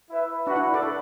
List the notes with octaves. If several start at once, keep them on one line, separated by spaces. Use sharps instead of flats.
E4 B4 E5
D4 F#4 B4 D5 F#5
E4
A4 D5
B4